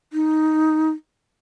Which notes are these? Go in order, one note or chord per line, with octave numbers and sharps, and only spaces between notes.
D#4